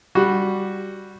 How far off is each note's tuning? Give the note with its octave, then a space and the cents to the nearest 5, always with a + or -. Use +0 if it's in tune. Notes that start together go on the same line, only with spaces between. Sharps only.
G3 +0 F#4 +0